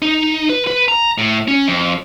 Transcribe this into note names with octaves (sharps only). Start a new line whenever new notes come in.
D#4
B4
B4
A#5
A2
C#4
F2